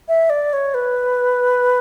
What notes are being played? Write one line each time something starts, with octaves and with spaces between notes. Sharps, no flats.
E5
D5
C#5
B4